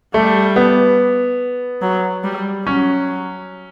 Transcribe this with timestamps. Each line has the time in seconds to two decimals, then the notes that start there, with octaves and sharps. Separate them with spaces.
0.14 G3 A3
0.56 B3
1.82 F#3
2.24 G3
2.66 F#3 C#4